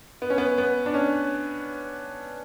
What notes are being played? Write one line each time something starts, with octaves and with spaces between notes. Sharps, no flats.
B3
C#4
B3
B3
D4
C#4